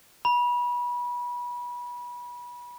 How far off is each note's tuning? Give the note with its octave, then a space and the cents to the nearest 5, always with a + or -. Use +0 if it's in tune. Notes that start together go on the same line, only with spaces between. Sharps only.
B5 -30